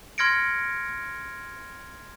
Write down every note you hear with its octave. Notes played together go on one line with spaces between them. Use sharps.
C6 F6 G#6 A#6 C#7 D7